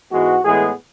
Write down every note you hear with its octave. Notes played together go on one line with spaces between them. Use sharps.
G#2 E3 G#3 B3 F#4
A2 E3 G#3 B3 G#4